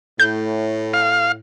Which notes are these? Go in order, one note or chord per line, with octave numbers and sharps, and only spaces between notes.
A2 G6
F5